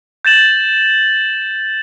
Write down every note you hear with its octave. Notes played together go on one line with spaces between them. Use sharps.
G6 A6 E7 F#7